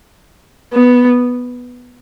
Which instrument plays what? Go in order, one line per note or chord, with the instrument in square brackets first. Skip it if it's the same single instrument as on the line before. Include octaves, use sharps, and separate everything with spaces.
[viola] B3